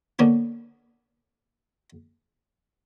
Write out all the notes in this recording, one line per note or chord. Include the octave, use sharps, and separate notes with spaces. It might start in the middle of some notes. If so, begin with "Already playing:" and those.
D3 A#3 B3 C#4